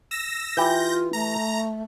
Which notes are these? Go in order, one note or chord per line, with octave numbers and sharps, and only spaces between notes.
E6 A#6
E3 F4 G4 G6 A#6
A3 A#5